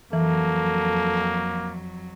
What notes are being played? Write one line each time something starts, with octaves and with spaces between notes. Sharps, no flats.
F2 E3 F#3 A#3 A4